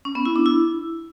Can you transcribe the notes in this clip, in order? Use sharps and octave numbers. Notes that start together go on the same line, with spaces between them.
C#4
B3
E4
D4
E4